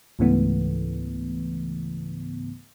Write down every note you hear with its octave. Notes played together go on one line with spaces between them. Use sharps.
C#2 G#2 C#3 E3 A3 B3